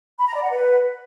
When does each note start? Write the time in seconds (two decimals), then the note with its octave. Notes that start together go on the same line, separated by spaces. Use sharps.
0.19 B5
0.27 A#5
0.35 D5
0.42 F#5
0.50 B4